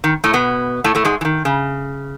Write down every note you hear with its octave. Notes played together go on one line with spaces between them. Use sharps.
D#3
A2 A3
B2 B3
A2 A3
A2 A3
G#2 G#3
E3
D#3
C#3